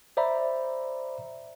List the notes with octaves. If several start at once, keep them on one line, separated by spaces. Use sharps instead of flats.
C5 D5 E5 A#5 B5